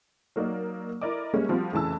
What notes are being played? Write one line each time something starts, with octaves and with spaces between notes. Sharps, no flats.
F#3 A#3 D#4 D5
E4 A#4 D5 D#5 D6
G3 G#3 A#3 C#4 E5
F3 G3 C4 F4 F#4
F1 C#3 E3 A5 E6